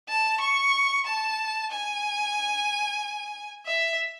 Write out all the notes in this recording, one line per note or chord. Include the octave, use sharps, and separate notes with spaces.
A5
C#6
A5
G#5
E5